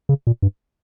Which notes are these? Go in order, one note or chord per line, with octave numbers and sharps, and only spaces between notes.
C#3
A#2
G2